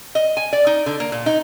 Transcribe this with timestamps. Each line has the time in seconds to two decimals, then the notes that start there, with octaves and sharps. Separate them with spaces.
0.15 D#5
0.37 G#5
0.53 D5
0.67 D#4
0.86 D3
1.00 A#3
1.12 A#2
1.26 D#4